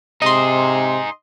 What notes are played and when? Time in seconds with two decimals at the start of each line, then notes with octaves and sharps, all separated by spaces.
0.22 C3 D#4 G#4 D#5 C6